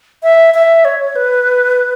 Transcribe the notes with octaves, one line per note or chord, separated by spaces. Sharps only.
E5
E5
C#5
B4